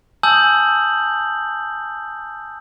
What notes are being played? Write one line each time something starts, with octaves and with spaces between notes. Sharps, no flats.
G#5 A5 D#6 E6 G6 F#7